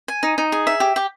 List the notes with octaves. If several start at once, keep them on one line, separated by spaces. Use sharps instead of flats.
G#5
D#4
D#4
G#4
E5
G4
G4